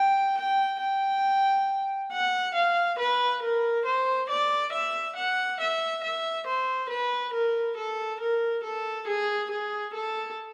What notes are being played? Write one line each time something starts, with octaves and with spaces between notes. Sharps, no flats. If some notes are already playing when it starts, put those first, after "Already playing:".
Already playing: G5
G5
G5
F#5
F5
B4
A#4
C5
D5
E5
F#5
E5
E5
C5
B4
A#4
A4
A#4
A4
G#4
G#4
A4